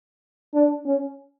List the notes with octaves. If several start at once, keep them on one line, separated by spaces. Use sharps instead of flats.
D4
C#4